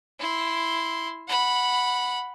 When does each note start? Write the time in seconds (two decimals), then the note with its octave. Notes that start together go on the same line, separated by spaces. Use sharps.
0.20 E4 C6
1.28 F#5 B5